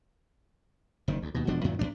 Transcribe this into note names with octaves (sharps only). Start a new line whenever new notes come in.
F#1 D#3
D2
D#2 B2
E1 B2 F3 D4
F#2 A#2 D#3 F#3
E2 G#2 D4